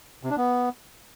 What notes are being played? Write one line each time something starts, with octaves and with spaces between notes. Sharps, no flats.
C3
D4
B3